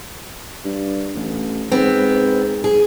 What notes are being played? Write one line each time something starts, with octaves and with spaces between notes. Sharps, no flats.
G2
A1
G#2 B3 C4
G#4